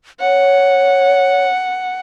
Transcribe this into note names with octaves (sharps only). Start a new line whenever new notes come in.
C#5 F#5